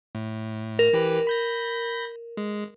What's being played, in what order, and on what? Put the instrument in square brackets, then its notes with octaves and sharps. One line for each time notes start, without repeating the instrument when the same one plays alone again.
[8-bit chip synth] A2
[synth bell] A#4
[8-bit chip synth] E3 G4 B4
B5 G6 A#6
G#3